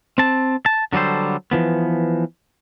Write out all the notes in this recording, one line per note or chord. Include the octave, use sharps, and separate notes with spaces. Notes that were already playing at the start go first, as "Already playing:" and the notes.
C4 A5
A5
D3 F#3 G3 A4 C5
E3 F3 B3